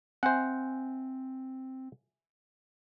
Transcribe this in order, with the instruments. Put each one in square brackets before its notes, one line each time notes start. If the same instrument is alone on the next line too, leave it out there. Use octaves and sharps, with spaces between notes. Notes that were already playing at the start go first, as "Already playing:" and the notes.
[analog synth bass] C4 [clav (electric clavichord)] C5 F#5 [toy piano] E5 G#5